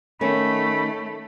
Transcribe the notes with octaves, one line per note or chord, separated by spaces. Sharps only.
D#3 A3 C#4 B5